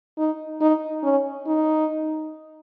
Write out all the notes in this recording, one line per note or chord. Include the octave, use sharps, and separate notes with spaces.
D#4
D#4
C#4
D#4